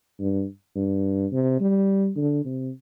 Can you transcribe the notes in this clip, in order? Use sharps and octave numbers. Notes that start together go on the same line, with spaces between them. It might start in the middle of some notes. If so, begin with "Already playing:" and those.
G2
G2
C3
G3
D3
C3